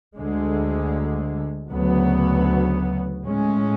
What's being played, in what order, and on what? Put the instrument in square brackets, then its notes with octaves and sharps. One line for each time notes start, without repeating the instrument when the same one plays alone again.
[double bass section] D2 D3 G#3
D2 C#3 F#3 B3
A2 G#3 C#4